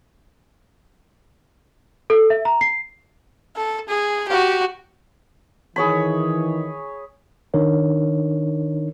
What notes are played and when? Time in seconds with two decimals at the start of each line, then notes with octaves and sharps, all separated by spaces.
2.10 A4
2.30 E5
2.45 A#5
2.61 C7
3.56 A4
3.89 G#4
4.28 F#4 G4
5.76 D#3 E3 G#4 C#5 B5
7.54 D#3 D4 D#4 A#4 C#5